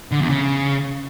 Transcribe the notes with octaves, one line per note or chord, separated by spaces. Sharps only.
D3
E2
C#3